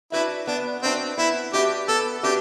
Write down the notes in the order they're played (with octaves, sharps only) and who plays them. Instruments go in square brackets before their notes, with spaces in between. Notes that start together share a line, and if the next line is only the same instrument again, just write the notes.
[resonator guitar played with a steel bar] D4 F#4 B4 E5 [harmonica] E4
[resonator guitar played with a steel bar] B3 [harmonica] D4
[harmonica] C4 [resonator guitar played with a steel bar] D4 F#4 B4 E5
[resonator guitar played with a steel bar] B3 [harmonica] E4
[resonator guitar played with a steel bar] D4 F#4 B4 E5 [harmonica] G4
[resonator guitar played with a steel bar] B3 [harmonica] A4
[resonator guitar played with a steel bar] D4 F#4 B4 E5 [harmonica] G4